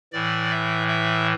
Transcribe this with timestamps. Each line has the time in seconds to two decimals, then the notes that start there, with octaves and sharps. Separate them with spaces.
0.12 A2 E3 D5
0.50 E5
0.87 E5